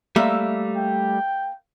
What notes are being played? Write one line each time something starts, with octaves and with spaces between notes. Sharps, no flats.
G3 A3 A#3 E5
G5